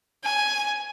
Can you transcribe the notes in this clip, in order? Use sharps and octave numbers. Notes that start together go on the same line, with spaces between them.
G#5